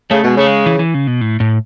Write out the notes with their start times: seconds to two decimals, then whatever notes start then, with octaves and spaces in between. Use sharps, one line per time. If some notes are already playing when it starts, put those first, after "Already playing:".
0.11 C#3 A3
0.24 B2 G#3
0.37 C#3 A3
0.47 G#3
0.66 E3
0.79 E3
0.94 C#3
1.07 B2
1.21 A2
1.40 A2